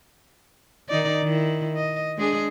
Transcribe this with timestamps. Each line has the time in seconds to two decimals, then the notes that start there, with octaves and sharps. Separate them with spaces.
0.89 D#3 D#4 D5
1.23 D#3 E4
1.76 D#5
2.17 G#3 D4 G#4